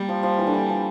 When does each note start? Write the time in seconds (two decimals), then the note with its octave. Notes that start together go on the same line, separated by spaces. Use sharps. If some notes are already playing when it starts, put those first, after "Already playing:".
Already playing: G3 A#3
0.09 F3
0.23 F3
0.38 E3
0.47 D3
0.54 E3
0.69 F3